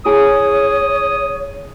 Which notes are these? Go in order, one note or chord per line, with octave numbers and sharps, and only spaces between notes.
E4 G#4 C#5 G#5 D#6